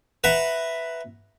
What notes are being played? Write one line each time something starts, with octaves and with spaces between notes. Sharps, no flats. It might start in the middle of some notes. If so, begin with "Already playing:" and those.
B4 E5 F#5 A#5